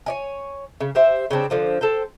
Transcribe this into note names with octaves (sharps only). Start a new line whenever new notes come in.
C#5 D5 G#5
C#3
G4 C5 E5
C#3 G3 C4 D4
D3 F3 C4
A4 C5 G5